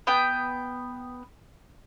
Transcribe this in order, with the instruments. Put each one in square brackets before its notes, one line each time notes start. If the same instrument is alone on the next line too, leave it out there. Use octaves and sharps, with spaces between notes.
[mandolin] B3 G5